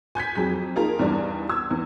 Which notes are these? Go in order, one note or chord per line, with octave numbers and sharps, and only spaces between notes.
G#5 G6 G#6 B6
F2 F#3 G#4 B6
A#3 D#4 F4 G#4 A#4 A#5
E2 G2 G3 D4 D#4
E6 G#6
E2